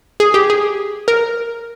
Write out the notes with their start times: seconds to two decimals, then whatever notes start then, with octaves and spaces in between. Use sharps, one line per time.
0.20 G#4
0.34 G4
0.50 G#4
1.08 A#4